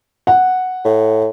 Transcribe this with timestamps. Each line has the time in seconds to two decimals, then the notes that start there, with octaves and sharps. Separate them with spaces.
0.27 F#5
0.85 A2